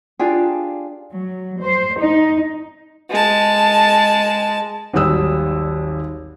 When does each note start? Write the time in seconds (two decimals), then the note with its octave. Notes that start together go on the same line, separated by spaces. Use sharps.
0.19 D4 F4 G4 G#4
1.13 F#3
1.62 C5
1.99 D#4
3.10 G#3 A5
4.93 G#1 D#2 F#3 G3 D#6 E6